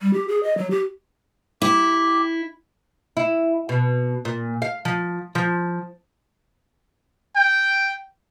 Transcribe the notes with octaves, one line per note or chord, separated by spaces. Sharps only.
G3
G4
G#4
D#5
F#3
G4
E4 G4
E4
B2
A#2
F5
F3
F3
G5